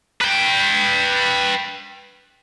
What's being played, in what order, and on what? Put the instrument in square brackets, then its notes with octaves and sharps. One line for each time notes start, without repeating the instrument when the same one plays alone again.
[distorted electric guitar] B4 G5